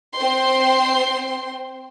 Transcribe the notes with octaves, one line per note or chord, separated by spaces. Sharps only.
C4 C5 G5 C6